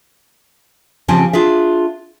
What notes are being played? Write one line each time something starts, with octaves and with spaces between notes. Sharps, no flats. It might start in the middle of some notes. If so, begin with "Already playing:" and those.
C#3 F3 C4 G4 G#5 A5
D4 F4 G#4 E5